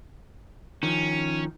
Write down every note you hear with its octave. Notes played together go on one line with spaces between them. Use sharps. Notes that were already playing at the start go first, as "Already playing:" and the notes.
D#3 F3 C#4